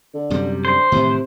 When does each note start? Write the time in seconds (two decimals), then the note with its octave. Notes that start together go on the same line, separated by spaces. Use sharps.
0.14 D3
0.30 F#2 C3 G3
0.65 D3 C5
0.92 A2 C3 D#3 E3